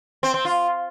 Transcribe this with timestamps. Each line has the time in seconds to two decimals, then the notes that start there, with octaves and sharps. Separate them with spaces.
0.23 C4
0.34 C4
0.45 F4